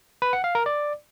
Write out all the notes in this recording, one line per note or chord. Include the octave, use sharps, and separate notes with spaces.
B4
F#5
F5
A#4
D5